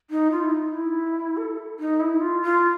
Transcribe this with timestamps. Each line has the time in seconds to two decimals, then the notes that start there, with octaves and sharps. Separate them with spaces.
0.10 D#4
0.31 F4
0.44 E4
0.52 D#4
0.74 E4
1.37 A4
1.79 D#4
2.00 E4
2.21 F4
2.43 F4